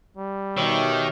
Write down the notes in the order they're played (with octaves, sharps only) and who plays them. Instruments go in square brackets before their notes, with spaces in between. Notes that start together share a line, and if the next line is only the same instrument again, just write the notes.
[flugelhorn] G3
[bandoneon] B2 G4 E6 [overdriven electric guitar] D#3 [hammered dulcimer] C#5 E5